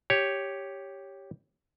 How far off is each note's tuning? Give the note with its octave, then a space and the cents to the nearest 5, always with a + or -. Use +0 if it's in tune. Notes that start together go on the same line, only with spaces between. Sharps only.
G4 +0 C#5 +0